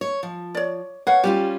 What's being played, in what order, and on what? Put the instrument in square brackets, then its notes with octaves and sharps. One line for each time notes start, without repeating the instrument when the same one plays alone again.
[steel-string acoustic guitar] C#5
F3
[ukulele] C#5 D5
[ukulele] B4 F5 F#5 [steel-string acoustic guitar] C#5
[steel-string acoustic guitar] G3 C#4 F4 [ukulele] G4